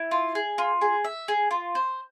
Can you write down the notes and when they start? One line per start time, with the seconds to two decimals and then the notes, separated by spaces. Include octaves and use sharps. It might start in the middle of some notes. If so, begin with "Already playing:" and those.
Already playing: E4
0.11 F4
0.35 G#4
0.58 F4
0.81 G#4
1.05 E5
1.28 G#4
1.51 F4
1.75 C5